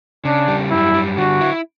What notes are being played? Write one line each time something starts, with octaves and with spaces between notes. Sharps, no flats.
C#3 D4
G3
F#2 E4
G3
D3 F#4
E4